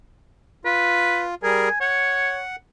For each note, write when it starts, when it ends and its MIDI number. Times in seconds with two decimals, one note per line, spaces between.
0.65 1.35 65
0.65 1.24 71
1.43 1.69 55
1.43 1.69 68
1.43 1.69 70
1.43 1.76 80
1.81 2.42 73
1.81 2.56 78